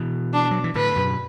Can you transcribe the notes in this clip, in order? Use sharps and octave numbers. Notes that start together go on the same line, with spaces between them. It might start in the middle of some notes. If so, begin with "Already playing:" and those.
Already playing: B2 E3
D4
F#3
E3
A2 D3 B4
F#2 B2